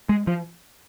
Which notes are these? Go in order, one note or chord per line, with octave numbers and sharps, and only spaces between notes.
G#3
F3